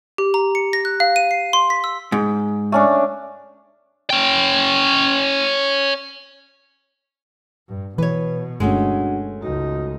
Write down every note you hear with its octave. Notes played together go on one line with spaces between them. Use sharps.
G4
A#5
C#7
A#6
F#6
F5
D#7
C7
C6
B6
E6
G#2
A3 C#4 D4
C#4 G5
G2
B2 E3 B4 C#5
G1 G#3 A3 C#4 D4 F#4 F#5
C#2 D#4 F#4